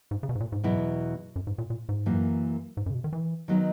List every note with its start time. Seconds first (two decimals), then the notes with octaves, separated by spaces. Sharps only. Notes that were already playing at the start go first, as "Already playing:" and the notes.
0.11 G#2
0.23 C#3
0.29 B2
0.35 G#2
0.40 A#2
0.52 G#2
0.63 E2 B2 F#3 B3 E4
1.36 F#2
1.47 G#2
1.58 A#2
1.70 A#2
1.89 G#2
2.06 F#2 E3 A#3
2.77 G#2
2.86 F#2
2.90 C#3
2.94 B2
3.04 D#3
3.13 E3
3.48 D#3 F#3 B3 D#4